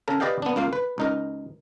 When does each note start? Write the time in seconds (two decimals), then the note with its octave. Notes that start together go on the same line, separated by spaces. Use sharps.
0.08 C#3 A4 A#4
0.20 G4 B4 D5 D#5 F5 G5
0.42 B3 D4
0.56 C#2 A#3 F4 F5
0.73 B4
0.98 C#2 D#4 A#4